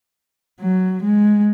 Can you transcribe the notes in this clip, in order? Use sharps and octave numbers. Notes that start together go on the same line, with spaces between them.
F#3
G#3